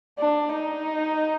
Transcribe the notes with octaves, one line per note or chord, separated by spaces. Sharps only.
D4
D#4